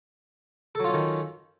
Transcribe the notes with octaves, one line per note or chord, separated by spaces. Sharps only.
D#3 F#3 C#4 F4 A4